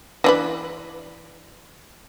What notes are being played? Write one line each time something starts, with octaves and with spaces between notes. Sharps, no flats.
E3 D4 B4